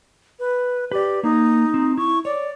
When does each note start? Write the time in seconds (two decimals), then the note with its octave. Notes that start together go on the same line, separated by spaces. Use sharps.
0.39 B4
0.92 G4 B4 D5
1.23 A#3 D#4
1.74 C4
1.98 E4 C#6
2.25 C#5 D5